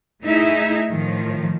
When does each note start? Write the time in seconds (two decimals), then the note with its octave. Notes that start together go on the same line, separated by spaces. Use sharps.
0.23 A3 D#4 E4 G#4 E5
0.90 A2 D#3 F3